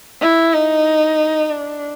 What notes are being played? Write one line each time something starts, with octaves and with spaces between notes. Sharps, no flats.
E4
D#4
D4